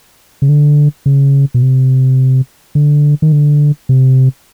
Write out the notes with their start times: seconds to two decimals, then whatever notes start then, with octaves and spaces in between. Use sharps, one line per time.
0.42 C#3
0.49 D3
1.06 C#3
1.54 B2
1.62 C3
2.75 D3
3.22 D#3
3.32 D3
3.89 C3